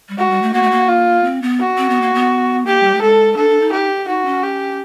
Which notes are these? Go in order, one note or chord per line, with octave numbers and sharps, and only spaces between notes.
G3
G#3 F#4
G3
A3
A#3 F#4
A3
A#3
F4
C4
B3
F#4
C4
B3
A#3
B3
A#3 G4
G3
A3
G#3 A4
D4 A4
D4
D#4
G4
D#4 F#4
C#4
G4